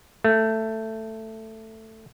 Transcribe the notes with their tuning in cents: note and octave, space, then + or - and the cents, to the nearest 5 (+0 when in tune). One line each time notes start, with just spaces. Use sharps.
A3 +10